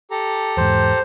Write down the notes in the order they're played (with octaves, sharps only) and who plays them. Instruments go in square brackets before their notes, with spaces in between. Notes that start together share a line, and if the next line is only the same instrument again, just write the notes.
[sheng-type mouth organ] G4 A4 A#5
[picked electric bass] E2 G#2 [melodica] C5